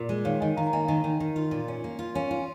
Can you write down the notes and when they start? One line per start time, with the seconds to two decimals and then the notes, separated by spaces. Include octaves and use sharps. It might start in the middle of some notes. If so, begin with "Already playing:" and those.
Already playing: A#2
0.09 G#3
0.25 D#3 C#5 F5
0.41 D#3 D#5 G#5
0.57 D#3 F5 A#5
0.67 A#5
0.73 A#3 D#5 G#5
0.84 F5
0.88 D#3 D#5 G#5
1.04 D#3
1.20 D#3
1.36 F4
1.51 A#2
1.68 C#4
1.84 A#3
1.99 F4
2.14 C#4 C#5 F5
2.31 F4